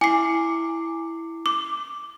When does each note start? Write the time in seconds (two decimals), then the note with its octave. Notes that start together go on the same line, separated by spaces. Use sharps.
0.01 E4 G#5 D6 C7
1.46 D6